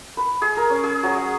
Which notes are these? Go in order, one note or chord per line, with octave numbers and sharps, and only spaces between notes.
B4
G#4
A#4
C#4
G#4
F#3
F#5